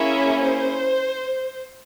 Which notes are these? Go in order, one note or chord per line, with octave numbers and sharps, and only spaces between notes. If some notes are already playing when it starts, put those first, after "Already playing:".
Already playing: A#3 C#4 E4 G#4 E5
C5